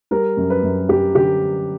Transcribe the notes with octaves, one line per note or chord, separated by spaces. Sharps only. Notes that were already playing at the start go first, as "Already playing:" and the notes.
G3 A#4
F#2
B4
F#2
F#2 G4
D3 G4